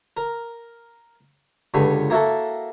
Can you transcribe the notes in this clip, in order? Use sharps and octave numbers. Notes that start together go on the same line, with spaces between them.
A#4
C#2 G2 D3 B5 C#6
A#3 E4 F#4 A4